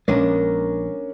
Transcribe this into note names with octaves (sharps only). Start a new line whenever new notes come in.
A#1 G#3 C#4 D4 A#4